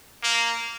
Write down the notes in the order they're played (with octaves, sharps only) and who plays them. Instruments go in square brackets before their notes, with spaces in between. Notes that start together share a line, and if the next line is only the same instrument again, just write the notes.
[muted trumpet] A#3